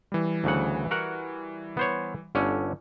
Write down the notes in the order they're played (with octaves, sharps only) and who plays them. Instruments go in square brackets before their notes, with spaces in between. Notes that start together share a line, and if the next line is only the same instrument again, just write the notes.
[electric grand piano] E3 G3
[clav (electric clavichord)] D2 C#3 F#5
F#4 A#4 F#5
B3 C5 C#5
G1 D3 C#4